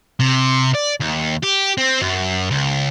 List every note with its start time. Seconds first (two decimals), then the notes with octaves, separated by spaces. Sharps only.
0.20 C3
0.75 D5
1.01 D#2
1.43 G4
1.78 C4
2.01 F#2
2.51 C#2